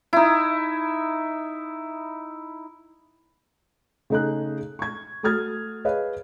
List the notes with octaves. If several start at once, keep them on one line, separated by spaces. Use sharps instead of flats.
D#4 E4
C#3 A3 D#4 G#4 F#6
C#6 G#6
A3 F#4 D#6 F6 G#6 A6
G#4 B4 C#5 D#5 F5